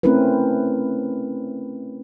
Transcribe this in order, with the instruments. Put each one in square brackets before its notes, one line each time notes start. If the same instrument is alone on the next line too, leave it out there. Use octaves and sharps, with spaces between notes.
[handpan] A3 C4 C#4 E4 A#4 B4